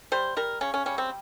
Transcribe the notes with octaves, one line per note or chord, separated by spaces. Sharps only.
G3 C5
G3 A#4
C#3 C#4
C#4
G3 C#4
C4